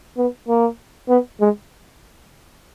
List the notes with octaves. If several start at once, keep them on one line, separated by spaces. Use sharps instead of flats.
B3
A#3
B3
G#3